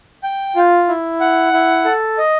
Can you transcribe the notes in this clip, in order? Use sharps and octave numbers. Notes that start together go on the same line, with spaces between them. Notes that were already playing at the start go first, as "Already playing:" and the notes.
G5
F4
E4
F#5
E4
A4
D#5